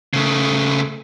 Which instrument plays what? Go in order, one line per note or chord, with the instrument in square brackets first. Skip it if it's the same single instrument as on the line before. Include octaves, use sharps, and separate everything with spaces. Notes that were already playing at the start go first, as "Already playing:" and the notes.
[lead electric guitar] C#3 A3